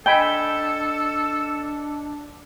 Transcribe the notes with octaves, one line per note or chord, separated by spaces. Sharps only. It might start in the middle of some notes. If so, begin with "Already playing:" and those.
D4 A4 D#5 G5 G#5 B5 G7